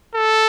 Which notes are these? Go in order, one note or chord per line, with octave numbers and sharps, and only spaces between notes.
A4